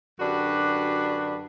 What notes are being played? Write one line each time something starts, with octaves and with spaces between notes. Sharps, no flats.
F#2 D3 D4 F#4 G4 B4